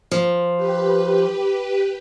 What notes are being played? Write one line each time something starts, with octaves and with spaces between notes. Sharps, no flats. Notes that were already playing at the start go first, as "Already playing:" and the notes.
F3
G4 B4